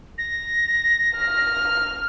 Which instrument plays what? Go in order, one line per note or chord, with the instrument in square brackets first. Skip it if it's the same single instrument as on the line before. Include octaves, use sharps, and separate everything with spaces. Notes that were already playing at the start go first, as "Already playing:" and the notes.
[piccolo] A#6
[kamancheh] F6